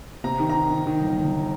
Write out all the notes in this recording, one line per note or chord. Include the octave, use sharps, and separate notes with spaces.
C3 A#5
D#3
A#5
D#3
D#3
D#3
G1
G1